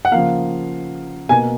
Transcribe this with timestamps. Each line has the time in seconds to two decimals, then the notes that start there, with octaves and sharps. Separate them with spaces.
0.05 F#5
0.11 C#3 F3 A#3 F5
1.29 B2 A#3 G#5